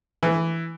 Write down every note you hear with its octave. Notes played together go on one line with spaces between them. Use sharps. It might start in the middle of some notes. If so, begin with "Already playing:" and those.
E3